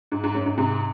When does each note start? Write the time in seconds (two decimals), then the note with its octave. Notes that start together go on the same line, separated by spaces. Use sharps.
0.12 G#2
0.23 G#2
0.35 F#2
0.46 G#2
0.57 G#2 C3